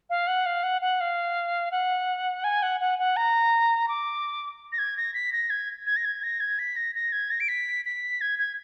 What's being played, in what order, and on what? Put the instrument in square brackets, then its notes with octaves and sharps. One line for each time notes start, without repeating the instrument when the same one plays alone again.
[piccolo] F5
F#5
F5
F#5
F#5
F5
F#5
G#5
F#5
F#5
F#5
A#5
D6
A#6
G#6
A#6
B6
A#6
G#6
G#6
A#6
G#6
A#6
G#6
B6
A#6
A#6
G#6
A#6
D7
B6
B6
G#6
G#6